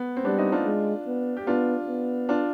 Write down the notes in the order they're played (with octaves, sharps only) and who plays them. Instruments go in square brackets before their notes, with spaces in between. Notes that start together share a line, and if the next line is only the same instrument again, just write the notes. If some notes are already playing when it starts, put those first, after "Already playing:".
Already playing: [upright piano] B3
C4
[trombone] G3 [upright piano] B3 D4
[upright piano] C4 D#4
D4 F4
[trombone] G#3
B3
[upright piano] G4
[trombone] B3 [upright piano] D4 F4
[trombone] B3
[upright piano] D4 F4